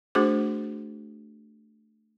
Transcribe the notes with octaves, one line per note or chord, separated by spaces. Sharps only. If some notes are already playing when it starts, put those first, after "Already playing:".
A3 D4 F#4 G#4 C5 D6